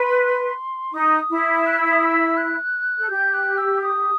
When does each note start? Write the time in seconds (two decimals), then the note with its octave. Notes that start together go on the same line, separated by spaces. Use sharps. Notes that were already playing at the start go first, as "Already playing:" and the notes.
Already playing: B4 C6
0.93 D#4 D#6
1.29 E4
1.66 F#6
1.78 E6
1.91 D#6
2.04 E6
2.37 F#6
2.99 A4
3.09 G4 G6
3.33 F#6
3.57 E6
3.82 D#6